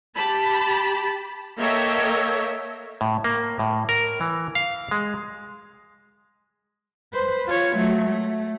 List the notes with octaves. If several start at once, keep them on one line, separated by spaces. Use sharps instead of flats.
G4 A5 B5
A#3 A4 C#5 D#5 E5 G5
A2
A#3
A2
A#4
E3
F5
G#3
B4 C5
F4 C#5
F#3 A3
A3